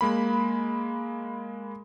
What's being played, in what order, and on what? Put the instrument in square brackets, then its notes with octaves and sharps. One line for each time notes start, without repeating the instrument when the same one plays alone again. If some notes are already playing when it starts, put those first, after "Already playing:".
[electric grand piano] G#3 A#3 B5